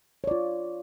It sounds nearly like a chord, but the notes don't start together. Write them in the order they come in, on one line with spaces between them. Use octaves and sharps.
C#5 D5 F4